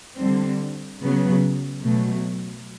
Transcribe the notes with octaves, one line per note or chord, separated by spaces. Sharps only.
D3 G3 C4
C#3 F#3 B3
B2 F#3 A3